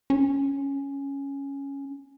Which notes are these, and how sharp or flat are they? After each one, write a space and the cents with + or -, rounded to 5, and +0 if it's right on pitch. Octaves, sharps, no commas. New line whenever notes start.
C#4 +0